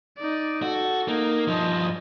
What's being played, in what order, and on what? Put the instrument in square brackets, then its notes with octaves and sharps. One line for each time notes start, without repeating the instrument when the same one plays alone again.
[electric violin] D#4 D5
[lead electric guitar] F#4 [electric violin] A4
[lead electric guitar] A#3 [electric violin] D#4
[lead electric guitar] G2 F3 [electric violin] D#5